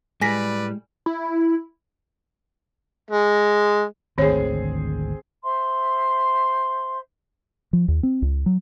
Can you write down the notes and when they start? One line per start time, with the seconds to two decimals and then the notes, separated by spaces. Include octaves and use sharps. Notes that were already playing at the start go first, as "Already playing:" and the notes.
0.21 A2 G3 G#3 B4 D5 G#5 A#6 B6
1.06 E4
3.11 G#3
4.18 G#1 D2 D3 D#3 C4 G#4 C#5
5.44 C5 E5 C6
7.73 F3
7.88 D#2
8.03 C4
8.22 C#2
8.46 F#3